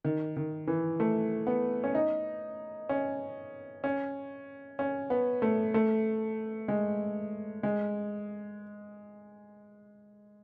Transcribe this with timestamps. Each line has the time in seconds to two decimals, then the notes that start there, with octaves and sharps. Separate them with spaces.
0.04 D#3
0.37 D#3
0.67 E3
1.00 A3
1.47 B3
1.84 C#4
1.95 D#4
2.89 C#4
3.84 C#4
4.79 C#4
5.10 B3
5.42 A3
5.74 A3
6.68 G#3
7.63 G#3